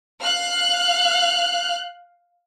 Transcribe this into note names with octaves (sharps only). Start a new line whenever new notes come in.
F5 F6 F#6